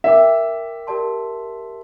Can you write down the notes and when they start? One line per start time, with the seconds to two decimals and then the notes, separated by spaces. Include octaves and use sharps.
0.04 A#4 D5 E5 G5 D6
0.87 G4 A#4 D5 A5 C6